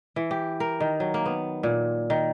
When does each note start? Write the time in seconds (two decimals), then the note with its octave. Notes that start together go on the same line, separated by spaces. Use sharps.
0.16 E3
0.31 G4
0.60 A#4
0.80 D#3
1.00 F#3
1.14 A#3
1.26 B3
1.63 A#2
2.10 D#3